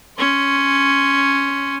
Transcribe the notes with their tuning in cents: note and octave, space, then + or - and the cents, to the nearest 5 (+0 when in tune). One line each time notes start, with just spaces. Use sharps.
C#4 +0 C6 +0